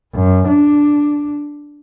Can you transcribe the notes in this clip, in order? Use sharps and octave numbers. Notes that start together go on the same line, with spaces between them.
F#2
D4